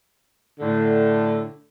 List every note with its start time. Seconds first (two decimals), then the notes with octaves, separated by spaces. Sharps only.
0.60 A2 D3